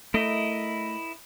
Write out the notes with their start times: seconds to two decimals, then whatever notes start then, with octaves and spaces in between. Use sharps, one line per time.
0.14 A3 E4 A#4 D#5